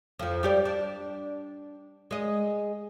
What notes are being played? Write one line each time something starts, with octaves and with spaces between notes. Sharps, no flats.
F2 F3
G3 G4 D5
D4
G#3 D#5